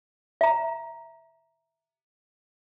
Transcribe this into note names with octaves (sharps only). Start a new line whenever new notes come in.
E5 A#5